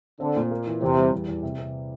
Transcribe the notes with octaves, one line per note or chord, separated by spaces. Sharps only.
D3 C4
A#2
A#3
E3
E2 C3
G3
E2
E2
C3
C3